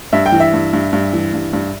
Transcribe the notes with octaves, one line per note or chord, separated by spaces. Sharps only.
G2 E5
G5
E3
E5
G2
G2
G2
E3
G2
G2